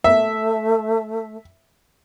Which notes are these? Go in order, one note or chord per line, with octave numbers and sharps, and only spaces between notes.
A3 E5